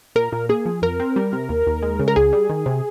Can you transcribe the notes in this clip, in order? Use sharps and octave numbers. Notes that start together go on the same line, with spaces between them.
A#2 A#4
A#2
A#3 G#4
F3
F2 A#4
C4
G3
C3
D#2
D#2
G#3
C#3
A#4
C#2 G#4
G3
D#3
C3